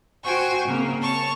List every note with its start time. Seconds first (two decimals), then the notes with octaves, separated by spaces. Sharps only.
0.24 F#4 C5 G5 G#5 C#6
0.66 C#3 A#3 C4
1.02 C#5 A5 C#6